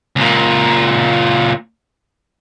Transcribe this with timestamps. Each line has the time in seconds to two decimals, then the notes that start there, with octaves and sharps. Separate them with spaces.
0.16 C#2 A#2